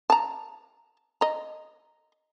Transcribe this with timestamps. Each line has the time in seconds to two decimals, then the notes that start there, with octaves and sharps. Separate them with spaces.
0.10 A5 A#5
1.21 D#5 A#5